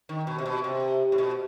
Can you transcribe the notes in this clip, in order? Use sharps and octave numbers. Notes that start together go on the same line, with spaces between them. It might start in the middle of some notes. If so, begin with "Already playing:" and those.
D#3
B2
C3
B2
C3
A2
B2